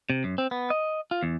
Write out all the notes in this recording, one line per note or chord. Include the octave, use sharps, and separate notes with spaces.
C3
F#2
C4
B3
D#5
F4
E2